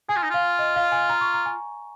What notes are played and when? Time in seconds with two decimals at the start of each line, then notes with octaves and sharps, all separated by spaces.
0.09 G#4 G#5
0.16 F4
0.23 D#4
0.30 F4 F5
0.59 D#5
0.76 F5
0.92 G#5
1.09 A#5
1.21 C#6
1.34 A#5
1.46 G#5